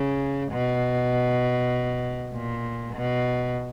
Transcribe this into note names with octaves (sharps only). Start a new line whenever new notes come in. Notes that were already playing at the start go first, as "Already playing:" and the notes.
Already playing: C#3
B2
A#2
B2